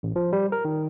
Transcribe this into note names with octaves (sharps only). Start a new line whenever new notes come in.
A1
F3
G3
A#4
D#3